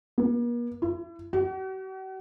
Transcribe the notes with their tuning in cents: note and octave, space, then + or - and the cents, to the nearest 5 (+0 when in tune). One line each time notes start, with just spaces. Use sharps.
A#3 +45
E4 +35
F#4 +45